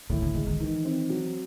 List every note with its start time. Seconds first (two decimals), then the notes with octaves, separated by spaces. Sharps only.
0.10 A2 D#3
0.22 D3
0.34 D3 G#3
0.47 D#3
0.60 D#3 E3
0.85 C4
1.10 F#3